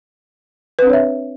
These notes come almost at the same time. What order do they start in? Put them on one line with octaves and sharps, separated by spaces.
B4 C4 D4 C#5 E5